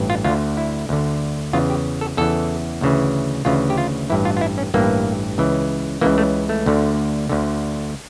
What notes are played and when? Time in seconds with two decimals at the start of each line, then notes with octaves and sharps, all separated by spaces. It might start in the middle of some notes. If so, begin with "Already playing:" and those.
Already playing: A1 G2 E3
0.10 F4
0.24 D2 D3 F4
0.57 E4
0.89 D2 D3
1.53 E2 C#3 E3 F4
1.70 G4
2.01 A4
2.17 E2 C#3 E3 A4
2.81 D2 C#3 E3
3.45 D2 C#3 E3 F4
3.70 G4
3.78 F4
4.10 A1 G2 E3 E4
4.25 F4
4.37 F4
4.41 E4
4.58 C#4
4.74 A1 G2 E3 A#3
5.38 C#2 C#3 E3
6.01 C#2 C#3 E3 A#3
6.18 A3
6.49 A3
6.66 D2 D3
7.29 D2 D3